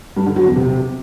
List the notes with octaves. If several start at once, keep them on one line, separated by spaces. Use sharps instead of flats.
G2
D3
F#3
E2
C3